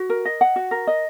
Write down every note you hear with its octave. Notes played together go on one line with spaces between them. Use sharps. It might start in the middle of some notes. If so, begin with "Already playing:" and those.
Already playing: F#4
A#4
D#5
F#5
F#4
A#4
D#5